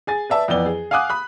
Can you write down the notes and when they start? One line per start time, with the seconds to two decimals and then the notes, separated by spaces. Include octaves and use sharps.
0.07 G#4 G#5 A6
0.30 B4 D5 E5 A5
0.48 F2 E3 B3 D5 G7
0.66 G#4
0.91 F5 F#5 G#5 D6 D#6 F#6
1.10 B5 D#6 F#6